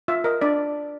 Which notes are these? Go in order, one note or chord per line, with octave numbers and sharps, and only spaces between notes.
F4 E5
A#4 D#5
D4 D5